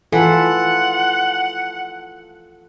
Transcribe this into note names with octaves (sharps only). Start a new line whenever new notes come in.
E3 F4 A4 F#5